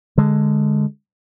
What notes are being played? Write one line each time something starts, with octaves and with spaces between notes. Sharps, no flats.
D3 G#3